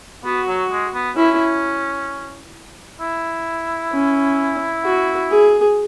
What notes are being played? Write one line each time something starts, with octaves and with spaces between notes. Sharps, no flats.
B3 F#4
F#3
G#3
B3
C#4 E4
E4
C#4
F#4
G#4